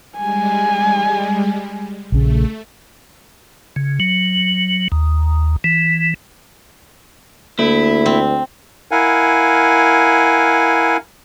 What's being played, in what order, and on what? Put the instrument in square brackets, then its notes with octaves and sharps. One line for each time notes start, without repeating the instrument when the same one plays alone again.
[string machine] G3 G#3 [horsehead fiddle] G#5
[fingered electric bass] A#1 C#3 [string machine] A3
[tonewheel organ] C#3
F#3
D#2
E3
[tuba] D2 [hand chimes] A#3 A4 [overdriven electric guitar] E4
[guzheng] C4
[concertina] E4 A#4 F5 F#5 G#5